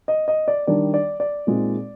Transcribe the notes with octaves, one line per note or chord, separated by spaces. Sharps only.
D#5
D#5
D5
D#3 G3 D4 D5
D5
D5
A#2 G#3 C4 D#4